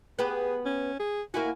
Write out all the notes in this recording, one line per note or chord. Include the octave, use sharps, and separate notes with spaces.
B3 G4 G#4 B4
C#4
G#4
A#3 E4 F#4 G#5